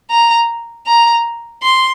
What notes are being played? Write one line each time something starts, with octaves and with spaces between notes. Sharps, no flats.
A#5
A#5
C6